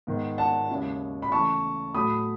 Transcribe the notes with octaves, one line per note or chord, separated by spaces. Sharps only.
G#2 D#3 G#3 B3
F#5 A5
D#2 C#3 G#3 C#4 E4
B5
C#3 E3 A3 A5 C#6
A2 F#3 A3 B5 D#6